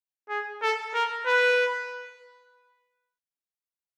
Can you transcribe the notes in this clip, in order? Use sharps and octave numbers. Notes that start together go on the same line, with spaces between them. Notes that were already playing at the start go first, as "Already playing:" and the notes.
G#4
A4
A#4
B4